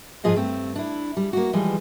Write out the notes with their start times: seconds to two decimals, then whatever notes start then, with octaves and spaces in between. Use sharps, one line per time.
0.24 G#2 F3 F4 G#4 D#5 F5
0.36 G2 A3 C4
0.76 D4 E4
1.17 G3
1.33 A#3 F#4
1.53 E3 F3 G3 G#3